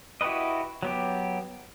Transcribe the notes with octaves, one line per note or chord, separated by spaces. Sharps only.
E4 F#4 G4 B4 D#5
F#3 B3 G4